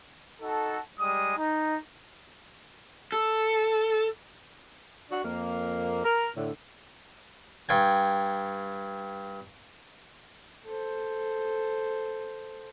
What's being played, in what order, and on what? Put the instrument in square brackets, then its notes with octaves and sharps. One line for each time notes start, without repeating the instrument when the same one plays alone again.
[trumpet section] D#4 F#4 A4
G3 G#3 D#6
D#4
[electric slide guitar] A4
[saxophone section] D4 F#4
F2 A#3
A#4
A2 D3
[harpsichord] G2 G5 G#5
[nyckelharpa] A4 C5